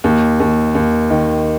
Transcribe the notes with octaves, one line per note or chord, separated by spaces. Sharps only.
D#2
D#2
D#2
D#3